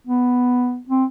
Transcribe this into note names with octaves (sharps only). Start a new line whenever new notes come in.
B3
C4